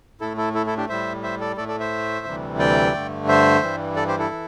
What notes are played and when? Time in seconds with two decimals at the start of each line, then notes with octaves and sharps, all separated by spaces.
0.21 A2 A3 E4 A4
0.37 E4 A4
0.55 E4 A4
0.66 E4 A4
0.77 D4 G4
0.89 A2 G3 C5 E5
1.23 C5 E5
1.40 A4 D5
1.57 A2 A3 A4 D5
1.68 A4 D5
1.80 C5 E5
2.26 D2 C3 E3 G3
2.59 D5 G5
2.94 G2 D3 A3
3.28 C5 E5
3.62 G2 E3 G3
3.96 A4 D5
4.08 G4 C5
4.19 E4 A4
4.32 E3